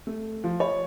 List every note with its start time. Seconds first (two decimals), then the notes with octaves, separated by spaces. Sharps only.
0.07 A3
0.44 F3
0.60 C#5